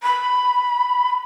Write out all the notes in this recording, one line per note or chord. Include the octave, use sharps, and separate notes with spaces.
B5